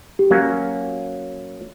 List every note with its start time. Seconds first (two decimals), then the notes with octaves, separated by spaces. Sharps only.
0.19 G4
0.30 F#3 A#3 C#4 F#4